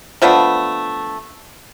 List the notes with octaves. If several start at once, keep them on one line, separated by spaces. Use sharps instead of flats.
F3 A3 B3 D4